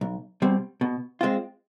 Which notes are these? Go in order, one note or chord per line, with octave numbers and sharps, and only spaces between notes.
B1
B2 G3 C4
B2
G#3 C4 F4